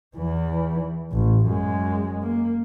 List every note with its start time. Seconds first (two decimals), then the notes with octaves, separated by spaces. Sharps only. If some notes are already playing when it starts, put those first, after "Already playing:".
0.17 E2 E3
1.12 A1
1.46 F#2 G#3
2.23 A#3